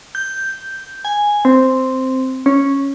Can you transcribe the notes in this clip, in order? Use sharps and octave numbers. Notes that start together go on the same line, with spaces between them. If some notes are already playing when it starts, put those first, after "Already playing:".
G6
G#5
C4
C#4